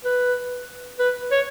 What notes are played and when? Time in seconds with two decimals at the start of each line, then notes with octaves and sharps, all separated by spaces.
0.05 B4
0.99 B4
1.31 C#5